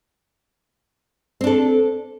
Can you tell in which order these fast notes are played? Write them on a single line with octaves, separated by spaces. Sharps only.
C4 D4 A4